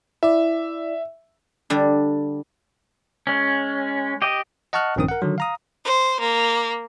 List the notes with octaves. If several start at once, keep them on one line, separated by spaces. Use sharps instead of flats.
E4 D5 E5
D3 G3 D4
G#3 C#4
G4 D#5
D#5 F#5 A5 C#6 F6 F#6
A#1 G2 D#3 C4 C#4 D#6
A#4 F#5
D3 D#3 F#3
F5 A#5 D#6
C5
A#3